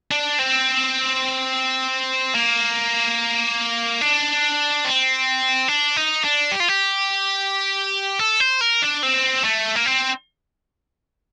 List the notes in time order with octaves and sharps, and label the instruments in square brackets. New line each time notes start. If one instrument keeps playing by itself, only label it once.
[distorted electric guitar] D4
C4
A#3
D4
C4
D4
D#4
D4
G4
F4
G4
A4
C5
A#4
D4
C4
A3
A#3
C4